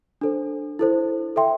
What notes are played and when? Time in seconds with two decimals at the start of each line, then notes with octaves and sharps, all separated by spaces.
0.21 D4 A4 C5
0.79 E4 A4 C5
1.36 A4 E5 G5 C6